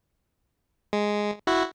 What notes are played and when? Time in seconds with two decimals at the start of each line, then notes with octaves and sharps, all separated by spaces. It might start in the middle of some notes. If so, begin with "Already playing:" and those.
0.93 G#3
1.47 E4 F#4